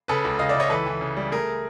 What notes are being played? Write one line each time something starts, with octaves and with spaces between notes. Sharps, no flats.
C#3 A4 B4
C#2
C#2 D#5 F5
D5 E5
C#2
C#5 D#5
E3 A4 B4
E3
C#3
G3
A3 G#4 A#4